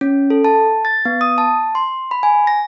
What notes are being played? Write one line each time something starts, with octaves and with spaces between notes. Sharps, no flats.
C#4
A4
A5
A6
B3
D#6
A5
C6
B5
G#5
A#6